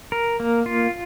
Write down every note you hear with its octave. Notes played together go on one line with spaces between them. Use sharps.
A#4
A#3
F4